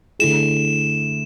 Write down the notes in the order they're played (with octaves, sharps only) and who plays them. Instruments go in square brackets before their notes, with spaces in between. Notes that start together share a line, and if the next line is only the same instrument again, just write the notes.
[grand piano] D3 A3 E4 G#4 [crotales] E7